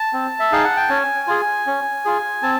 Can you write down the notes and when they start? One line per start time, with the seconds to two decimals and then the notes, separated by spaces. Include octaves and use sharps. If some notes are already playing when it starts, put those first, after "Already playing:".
Already playing: A5
0.13 C4
0.40 E5
0.52 D#4 G#4 F5
0.64 F#5
0.77 G5
0.89 C#4 G#5
1.27 F4 G#4
1.67 C#4
2.05 F4 G#4
2.42 C4 A5